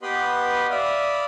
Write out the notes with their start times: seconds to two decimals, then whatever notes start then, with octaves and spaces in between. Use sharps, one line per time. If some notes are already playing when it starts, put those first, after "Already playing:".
0.02 B3 G4 B4 D#5 B5 C6
0.70 D5 E5 F5 B5 D#6